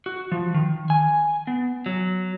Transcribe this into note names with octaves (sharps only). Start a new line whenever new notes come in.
F#4
F3
D#3
G#5
B3
F#3